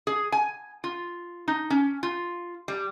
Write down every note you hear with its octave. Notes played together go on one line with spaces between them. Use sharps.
G#4
G#5
F4
D#4
C#4
F4
G3